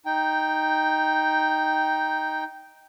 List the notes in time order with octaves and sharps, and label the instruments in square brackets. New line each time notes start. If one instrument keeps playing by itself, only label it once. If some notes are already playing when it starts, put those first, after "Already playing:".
[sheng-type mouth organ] D#4 G5